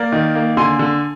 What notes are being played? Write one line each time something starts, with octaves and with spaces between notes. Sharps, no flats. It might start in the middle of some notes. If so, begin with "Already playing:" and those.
Already playing: A#3 A#4 D5
D#3
A#3
D3 G#5 C6
D3